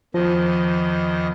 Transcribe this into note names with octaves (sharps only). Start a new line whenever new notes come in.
E2 D#3 F3 D#5